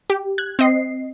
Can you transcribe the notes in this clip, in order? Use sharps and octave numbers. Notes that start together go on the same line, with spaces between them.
G4
F#6 G#6
C4 D#5 C7